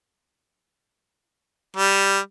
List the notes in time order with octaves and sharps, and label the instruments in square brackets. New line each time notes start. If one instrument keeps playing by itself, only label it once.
[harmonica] G3